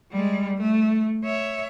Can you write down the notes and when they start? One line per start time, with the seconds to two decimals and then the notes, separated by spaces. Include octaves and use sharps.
0.12 G3 G#3
0.57 A3
1.25 C#5 E5